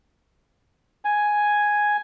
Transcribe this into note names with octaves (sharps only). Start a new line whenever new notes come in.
G#5